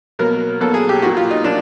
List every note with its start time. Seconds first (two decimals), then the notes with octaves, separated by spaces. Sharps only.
0.19 B2 F#3 A#3 A#4
0.61 B2 F#3 A#3 A4
0.74 G#4
0.89 G4
1.02 A#2 F#3 A#3 F#4
1.17 F4
1.31 D#4
1.44 A#2 F#3 A#3 D4